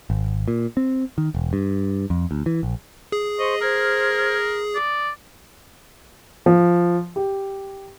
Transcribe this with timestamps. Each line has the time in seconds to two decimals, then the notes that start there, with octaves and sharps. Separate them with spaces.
0.10 G#1
0.48 A#2
0.77 C4
1.18 D#3
1.35 E1
1.53 G2
2.10 F2
2.31 D2
2.46 E3
2.63 A#1
3.12 G#4
3.39 C5 D#5 C6 C#6
3.61 A#4 C5 F6 G#6
4.75 D5 D#6
6.46 F3
7.16 G4